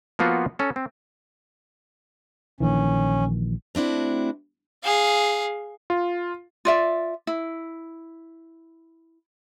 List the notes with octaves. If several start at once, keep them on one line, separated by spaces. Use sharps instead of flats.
F3 A#3 B3 F4 F#4
C#4 A4
C4
A#1 D#3 E3 C#4
A3 C4 D4 E4 F#4
G#4 F5
F4
F4 D5 E5
E4